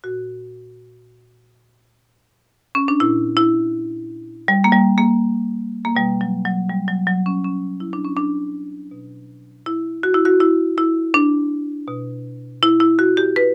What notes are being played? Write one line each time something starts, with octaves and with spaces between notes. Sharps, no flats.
A#2 F#4
C#4
D4
A#2 E4
E4
G3
A#3
G3
A#3
A#3
B2 G3
F#3
F#3
G3
F#3
F#3
C#4
C#4
E4
D4
C#4
D4
B2
E4
F#4
E4
F#4
E4
E4
D4
B2
E4
E4
F#4
G4
B4